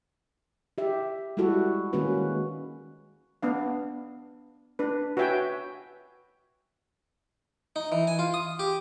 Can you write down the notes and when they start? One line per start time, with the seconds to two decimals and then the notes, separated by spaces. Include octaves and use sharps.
0.78 G4 E5
1.37 G3 G#3 E4 F#4 A4
1.93 D#3 G#3 A#3 C#4 F#4 B4
3.43 B3 D4 F5
4.79 D4 B4
5.17 F#4 B4 C#5 E5 G5 G#5
7.76 D#4
7.92 E3
8.07 G#5
8.19 F4
8.34 D#6
8.59 G4